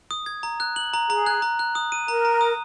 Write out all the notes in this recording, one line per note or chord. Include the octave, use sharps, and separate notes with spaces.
D#6
G#6
A#5
F#6
F#7
A#5
G#4 A#5
F#6
A#5
F#6
D#6
D#7
A#4 A#5
A#5
D#6